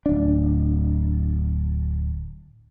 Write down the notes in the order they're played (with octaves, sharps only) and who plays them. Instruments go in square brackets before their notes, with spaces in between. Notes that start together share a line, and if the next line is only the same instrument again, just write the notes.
[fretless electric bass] D1 D4